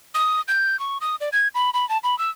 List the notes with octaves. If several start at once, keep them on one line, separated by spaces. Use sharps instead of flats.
D#6
G6
C#6
D#6
D5
G#6
B5
B5
A5
B5
E6